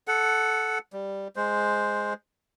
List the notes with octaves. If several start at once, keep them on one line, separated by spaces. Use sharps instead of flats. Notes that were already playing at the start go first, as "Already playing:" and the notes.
A4 F#5
G3
G#3 C5